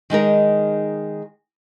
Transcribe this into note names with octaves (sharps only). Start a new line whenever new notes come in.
D#3 G#3 D#4 A#4